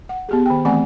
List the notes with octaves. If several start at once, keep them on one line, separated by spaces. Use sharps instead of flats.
F#5
B3 G4 G#4
D#3 G5
E3 A3 C4 F#5 G#5